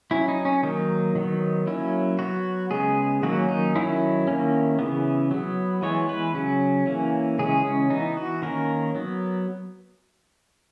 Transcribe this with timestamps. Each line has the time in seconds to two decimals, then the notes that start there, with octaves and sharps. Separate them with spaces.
0.11 F#3 C#4 E4
0.28 D#4
0.45 C#4
0.63 D#3 F#3 A#3 D#4
1.15 D#3 F#3 B3
1.67 F#3 A#3 C#4 E4
2.19 F#3 B3 F#4
2.71 C#3 G#3 B3 G#4
3.23 D#3 F#3 A#3 C#4 F#4
3.49 D#4
3.75 D#3 F#3 C#4 E4
4.28 D#3 A#3 C#4
4.79 C#3 E3 B3
5.31 F#3 B3
5.82 E3 G#3 B3 C#5
6.09 B4
6.34 C#3 F#3 C#4
6.87 E3 A#3 C#4
7.39 C#3 E3 G#3 C#4 G#4
7.65 C#4
7.90 E3 B3 D#4
8.17 F#4
8.42 D#3 A#3 C#4 A#4
8.94 F#3 B3